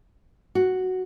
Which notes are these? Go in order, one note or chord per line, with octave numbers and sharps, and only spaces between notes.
F#4